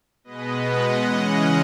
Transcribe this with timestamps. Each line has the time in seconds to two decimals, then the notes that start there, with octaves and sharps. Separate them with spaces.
0.24 B2 G#3 B3 B4 D#5
0.61 D#5 F#5
0.98 C#3 E3 G#3 C#4 D#5 F#5